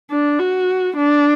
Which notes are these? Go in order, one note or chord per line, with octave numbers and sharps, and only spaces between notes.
D4
F#4
D4